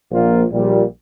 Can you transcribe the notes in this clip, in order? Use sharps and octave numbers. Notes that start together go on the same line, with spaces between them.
A#1 A#2 A#3 F4
A#1 A#2 G3